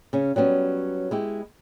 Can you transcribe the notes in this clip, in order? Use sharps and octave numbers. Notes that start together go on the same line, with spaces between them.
C#3 C#4
F#3 G3 B3 C#4
G#3 E4 G4